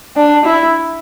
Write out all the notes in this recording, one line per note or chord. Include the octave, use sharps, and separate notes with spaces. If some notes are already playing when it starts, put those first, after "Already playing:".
D4
E4